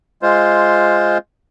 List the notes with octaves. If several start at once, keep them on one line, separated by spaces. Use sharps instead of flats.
G#3 F4 C5